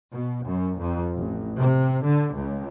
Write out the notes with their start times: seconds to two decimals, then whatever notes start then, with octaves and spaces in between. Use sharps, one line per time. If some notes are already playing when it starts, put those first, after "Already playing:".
0.13 B2
0.46 F#2
0.79 F2
1.16 A1
1.58 C3
2.06 D3
2.36 C#2